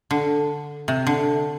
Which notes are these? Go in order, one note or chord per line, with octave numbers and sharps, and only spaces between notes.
D3
C3
D3